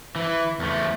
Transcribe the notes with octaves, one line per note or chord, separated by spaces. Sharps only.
E3
E2 A3